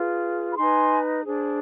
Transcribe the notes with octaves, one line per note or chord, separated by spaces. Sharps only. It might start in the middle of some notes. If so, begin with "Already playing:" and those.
Already playing: F4 G#4 B4
B5
D#4 B4 G#5 C6
D4 G#4 C5